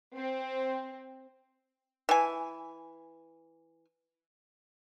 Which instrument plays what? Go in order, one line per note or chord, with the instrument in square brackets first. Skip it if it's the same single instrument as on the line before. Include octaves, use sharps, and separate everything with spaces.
[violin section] C4
[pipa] E3 G#5